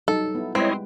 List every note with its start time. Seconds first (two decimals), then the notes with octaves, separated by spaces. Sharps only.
0.08 F#3 G3 D#4 A4
0.35 B3 E4
0.55 G3 G#3 C4 E4 B4 C#5 D#5